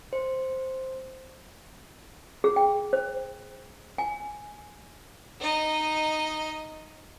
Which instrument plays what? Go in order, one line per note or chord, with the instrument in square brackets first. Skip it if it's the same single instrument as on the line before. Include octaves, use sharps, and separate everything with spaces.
[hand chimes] C5
[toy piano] G#4
G5
C5
G#5
[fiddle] D#4 D#5